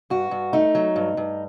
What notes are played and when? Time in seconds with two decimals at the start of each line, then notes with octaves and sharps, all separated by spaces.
0.10 G2 F#4
0.31 G2
0.53 A3 D#4
0.75 F#3
0.96 G2
1.17 G2